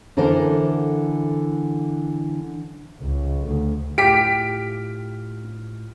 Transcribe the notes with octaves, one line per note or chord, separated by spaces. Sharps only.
D3 E3 A4 A#4 C5
C#2
D2
A2 F4 G4 F6 B6 D7